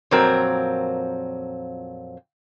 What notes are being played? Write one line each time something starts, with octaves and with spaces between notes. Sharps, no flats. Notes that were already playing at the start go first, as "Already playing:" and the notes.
F2 A#2 F#3 C4 A#4